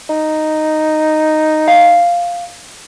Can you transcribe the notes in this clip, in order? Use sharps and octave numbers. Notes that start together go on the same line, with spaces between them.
D#4
F5